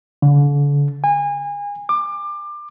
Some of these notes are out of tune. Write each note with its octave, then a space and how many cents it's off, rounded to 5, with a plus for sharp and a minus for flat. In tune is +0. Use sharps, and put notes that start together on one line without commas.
D3 -40
G#5 -30
D6 +25